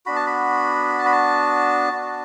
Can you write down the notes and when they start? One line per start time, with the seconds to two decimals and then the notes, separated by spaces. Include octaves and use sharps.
0.06 B3 D4 F#4 B5
0.16 A5
0.27 B5
0.99 A5
1.06 B5
1.12 A5
1.92 B3 D4 F#4